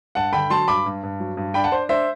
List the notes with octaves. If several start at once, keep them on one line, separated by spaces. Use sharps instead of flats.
G2 F#5 A5
D3 G5 B5
F#3 A5 C6
G2 B5 D6
G2
G2
F#3
G2
D4 G5 B5
F#5 A5
D4 C5
D4 C5 E5